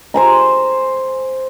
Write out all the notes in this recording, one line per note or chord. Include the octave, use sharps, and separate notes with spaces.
C5 G#5 A#5